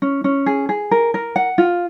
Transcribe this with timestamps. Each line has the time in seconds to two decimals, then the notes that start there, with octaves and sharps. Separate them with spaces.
0.02 C#4
0.24 C#4
0.46 G#4
0.69 G#4
0.91 A#4
1.14 A#4
1.36 F#5
1.58 F4